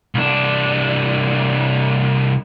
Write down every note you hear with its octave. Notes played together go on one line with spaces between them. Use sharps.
C2 D4